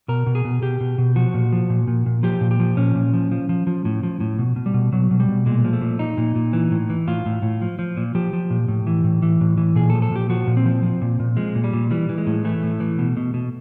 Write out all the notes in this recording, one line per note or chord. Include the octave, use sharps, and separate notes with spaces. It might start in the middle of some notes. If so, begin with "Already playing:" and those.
B2 A#4
B2
G#4
B2
B2 G4
B2
B2
F3 F#4
A#2
F3
A#2
A#2
A#2
F3 G4
A#2
G4
F3
A#2 C#4
A#2
F3
F3
F3
F3
A2
F3
A2
B2
B2
G3
B2
B2 F#3
B2
G3
B2
A#2 G#3
F3
A3
A#2
A#2 D#4
A#2
A#2
E3
A2
E3
A2 F4
A2
A2
F3
F3
A#2
F3 G4
F3
A#2
A2
E3
A2
E3
A2
E3
A#2 G#4
A4
F3
A4
A#2 G4
F3 F#4
A#2
C4
F3
F3
A#2
A#2
F3 G#3
A#2
G3
A#2
E3 G3
E3
G#3
A2
E3 A3
A2
E3
B2
B2
B2